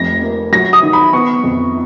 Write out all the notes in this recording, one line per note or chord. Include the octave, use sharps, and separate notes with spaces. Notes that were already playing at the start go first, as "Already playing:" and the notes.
Already playing: F1 F2 A#6
A#3
F#3 A#6
D#6
D#3
B5
B3 C#6
F2